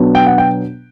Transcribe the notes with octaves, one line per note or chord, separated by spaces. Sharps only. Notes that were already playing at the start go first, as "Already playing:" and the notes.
Already playing: B2 F#3 B3 D4
G5
F#5
G5